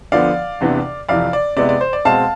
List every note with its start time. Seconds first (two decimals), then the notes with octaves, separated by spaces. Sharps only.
0.12 D3 F3 B3 D5 F5
0.60 E2 C3 E3 B3 D4
1.08 F2 C3 E3 D5 F5
1.33 D5
1.57 C3 G#3 B3 E4 D5
1.69 D5
1.81 C5
1.93 D5
2.05 B2 G#3 C4 F5 A5